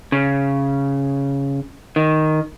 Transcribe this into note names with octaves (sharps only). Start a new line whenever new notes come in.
C#3
D#3